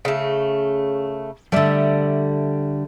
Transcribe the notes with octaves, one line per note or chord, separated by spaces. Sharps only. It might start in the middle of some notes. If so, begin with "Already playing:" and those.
C#3 A3
D3 G3 A3 D5 E5